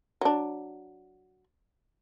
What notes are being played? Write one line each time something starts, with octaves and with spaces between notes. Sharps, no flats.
F#3 D4